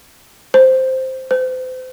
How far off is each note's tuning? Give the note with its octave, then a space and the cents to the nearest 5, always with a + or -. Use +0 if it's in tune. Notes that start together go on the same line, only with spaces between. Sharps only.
C5 +0
C5 -35